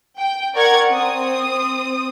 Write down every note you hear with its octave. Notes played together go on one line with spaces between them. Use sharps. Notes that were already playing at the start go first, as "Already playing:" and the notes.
G5
A#4 D5 F#5 C#6 G#6
C4 D#6